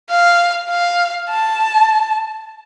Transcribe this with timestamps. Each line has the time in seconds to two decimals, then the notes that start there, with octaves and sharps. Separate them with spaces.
0.10 F5
0.70 F5
1.30 A5